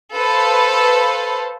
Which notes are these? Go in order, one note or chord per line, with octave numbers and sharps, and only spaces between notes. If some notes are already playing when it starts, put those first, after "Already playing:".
A4 B4 C5 F5